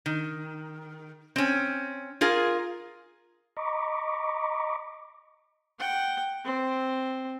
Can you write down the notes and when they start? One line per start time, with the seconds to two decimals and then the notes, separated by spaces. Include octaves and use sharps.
0.06 D#3
1.36 C4 C#4
2.21 F4 G#4 A#4 F5
3.57 D#5 A#5 B5 C#6 D6
5.80 F#5 G5
6.45 C4